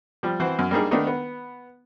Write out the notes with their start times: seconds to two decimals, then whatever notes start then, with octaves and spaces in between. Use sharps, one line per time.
0.23 F3 G3
0.40 E3 C4 F#4 C5
0.59 F#2
0.71 G3 A#3 D4 D#4 G#4
0.91 D#3 A3 B3 D4 D#4
1.07 B3